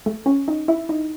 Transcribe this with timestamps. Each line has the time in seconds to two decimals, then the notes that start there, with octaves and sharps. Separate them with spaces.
0.06 A3
0.26 C#4
0.48 D#4
0.68 E4
0.89 D#4